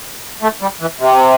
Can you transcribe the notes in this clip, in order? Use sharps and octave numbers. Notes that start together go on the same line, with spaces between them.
A3
G3
E3
C3